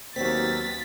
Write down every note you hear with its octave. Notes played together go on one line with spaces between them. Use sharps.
D#2 F#3 B3 C4 A6 B6